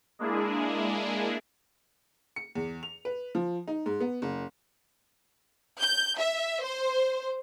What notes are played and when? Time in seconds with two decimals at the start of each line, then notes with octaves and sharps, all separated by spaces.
0.19 G#3 A#3 D4 E4 G#4
2.36 C#7
2.55 E2
2.83 F7
3.05 B4
3.35 F3
3.68 D#4
3.86 G#2
4.00 B3
4.22 F#1
5.81 G6
6.18 E5
6.63 C5